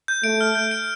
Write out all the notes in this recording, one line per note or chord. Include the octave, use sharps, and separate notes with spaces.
G6
A3 D7
F6
G6
D7